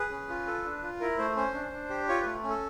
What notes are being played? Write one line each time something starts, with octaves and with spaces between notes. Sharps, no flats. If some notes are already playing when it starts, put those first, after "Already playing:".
Already playing: G#4 B4
C#4
F4
A4
D4
F4
E4 A#4
A3 C5
C#4 C5
D4
D4
G4
F4 C#5
A3 B4
C#4
A4